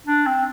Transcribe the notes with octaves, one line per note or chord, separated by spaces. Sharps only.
D4
C4